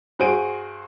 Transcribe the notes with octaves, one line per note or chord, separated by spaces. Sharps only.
G2 F#4 G#4 C5 D7 D#7